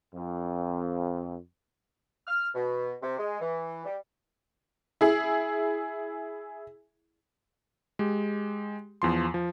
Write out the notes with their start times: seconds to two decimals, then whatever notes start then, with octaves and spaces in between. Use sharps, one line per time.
0.14 F2
2.27 F6
2.55 B2
3.02 C3
3.18 G#3
3.40 E3
3.86 G3
5.01 E4 G#4
7.99 G#3 G4
9.02 E2 F3 C6
9.34 F3